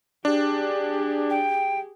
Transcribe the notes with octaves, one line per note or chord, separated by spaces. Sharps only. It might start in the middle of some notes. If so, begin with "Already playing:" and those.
D4 G4 G#4
G5